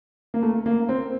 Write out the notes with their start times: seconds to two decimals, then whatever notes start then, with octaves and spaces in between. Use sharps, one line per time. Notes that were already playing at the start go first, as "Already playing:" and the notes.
0.34 A#3
0.43 A3
0.66 A#3
0.89 C4